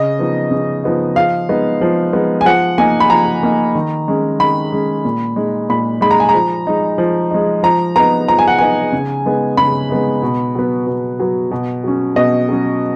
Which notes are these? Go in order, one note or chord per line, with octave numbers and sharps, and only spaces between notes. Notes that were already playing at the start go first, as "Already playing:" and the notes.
Already playing: C#3 D#5
F3 B3 D#4
C#3
F3 B3 D#4
F3 F5
G#3 B3 D#4
F3
G#3 B3 D#4
G#5
F3 F#5
A#3 D#4 G#5
B5
F3 A#5
A#3 D#4
D#3
G#3 C#4
D#3 B5
G#3 C#4
A#2
G#3 D#4
A#2 B5
G#3 D#4 B5
A#5
G#5
A#5
F3
G#3 D#4
F3
G#3 D#4
F3 A#5
B3 D#4 A#5
F3 A#5
G#5
F#5
B3 D#4 G#5
C#3
G#3 B3 D#4
C#3 B5
G#3 B3 D#4
B2
F#3 B3
B2
F#3 B3
B2
F#3 C#4
B2 D#5
F#3 C#4